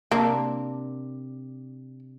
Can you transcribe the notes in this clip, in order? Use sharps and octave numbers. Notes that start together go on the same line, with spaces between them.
C3 A#3 D4